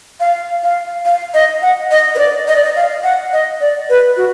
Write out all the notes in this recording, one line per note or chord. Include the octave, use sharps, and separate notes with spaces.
F5
F5
F5
D#5
F#5
D#5
B4
D5
D#5
D5
D#5
F5
F#5
D#5
D5
B4
F#4